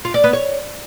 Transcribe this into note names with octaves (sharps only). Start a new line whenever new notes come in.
F4
D5
B3
C#5